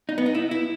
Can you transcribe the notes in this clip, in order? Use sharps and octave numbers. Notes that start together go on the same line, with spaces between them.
D#4
B3
D#4
E4
E4